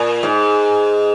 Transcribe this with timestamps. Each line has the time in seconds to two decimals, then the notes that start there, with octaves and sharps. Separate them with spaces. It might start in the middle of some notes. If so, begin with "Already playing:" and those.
Already playing: A#2
0.23 G#2